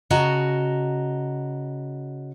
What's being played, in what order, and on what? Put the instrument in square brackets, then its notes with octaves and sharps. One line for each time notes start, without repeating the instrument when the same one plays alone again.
[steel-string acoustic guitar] C#3 F#4 D#5 A5 A#5